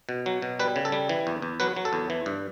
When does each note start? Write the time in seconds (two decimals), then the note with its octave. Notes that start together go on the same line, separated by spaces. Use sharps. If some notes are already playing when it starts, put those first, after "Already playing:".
0.09 B2
0.26 F#3
0.42 B2
0.59 G3 B4
0.76 C#3
0.85 A4
0.92 G3
1.09 E3
1.27 E2
1.42 E2
1.60 F#3 B4
1.76 F#3
1.85 A4
1.93 E2
2.10 E3
2.26 G2